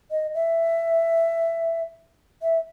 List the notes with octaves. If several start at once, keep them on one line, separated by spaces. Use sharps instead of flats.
D#5
E5
E5